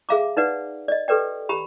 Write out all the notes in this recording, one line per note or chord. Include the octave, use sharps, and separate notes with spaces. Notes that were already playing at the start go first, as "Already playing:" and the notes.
G#4 E5 F5 A#5 D6
D#4 B4 D5 F#5
D5 D#5
G4 A4 B4 D5 G5
G4 A#5 B5